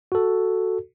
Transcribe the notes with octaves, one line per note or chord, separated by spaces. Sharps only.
F#4 A4